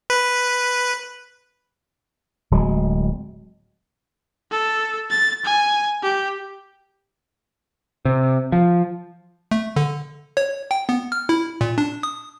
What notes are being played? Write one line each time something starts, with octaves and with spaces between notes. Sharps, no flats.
B4
D1 F#3 G#3
A4
A6
G#5
G4
C3
F3
A3
D3
C#5
G5
B3
F6
E4
A#2
D4
D#6